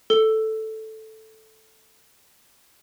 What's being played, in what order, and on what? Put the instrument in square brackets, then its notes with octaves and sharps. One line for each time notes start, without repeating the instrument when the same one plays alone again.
[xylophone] A4 G7